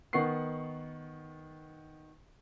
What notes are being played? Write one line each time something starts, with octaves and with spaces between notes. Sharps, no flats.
D#3 B3 F#5 C#6 C7